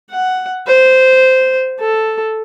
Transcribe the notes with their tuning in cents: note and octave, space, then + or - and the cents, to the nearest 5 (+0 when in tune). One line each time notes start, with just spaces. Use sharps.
F#5 +5
C5 -10
A4 +0